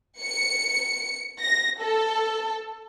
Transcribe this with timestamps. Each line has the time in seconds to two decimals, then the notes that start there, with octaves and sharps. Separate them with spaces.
0.21 C#7
1.40 A#6
1.81 A4